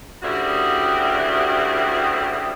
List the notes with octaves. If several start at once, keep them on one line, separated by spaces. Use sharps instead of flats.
D2 C#3 G3 E4 F#4 G4